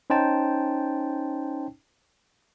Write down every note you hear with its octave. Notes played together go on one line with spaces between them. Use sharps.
C#4 D#4 C5 G5 A5